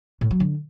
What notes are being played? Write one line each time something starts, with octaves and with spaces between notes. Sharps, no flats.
A2
F#3
D3